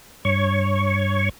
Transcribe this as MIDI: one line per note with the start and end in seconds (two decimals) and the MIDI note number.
0.25 1.29 43
0.25 1.29 73
0.25 1.29 85